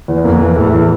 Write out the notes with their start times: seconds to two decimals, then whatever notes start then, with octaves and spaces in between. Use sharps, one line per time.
0.08 E2
0.24 F2 A#3
0.41 E3
0.56 E2 A2
0.72 E3